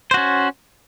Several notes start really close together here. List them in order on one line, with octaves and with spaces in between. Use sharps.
C5 F#4 C#4